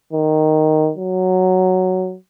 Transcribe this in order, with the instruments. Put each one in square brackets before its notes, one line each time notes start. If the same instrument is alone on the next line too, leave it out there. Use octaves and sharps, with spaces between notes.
[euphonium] D#3
F#3